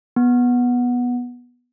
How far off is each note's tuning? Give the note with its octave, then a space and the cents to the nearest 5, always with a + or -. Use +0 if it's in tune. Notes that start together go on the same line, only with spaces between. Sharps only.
B3 -10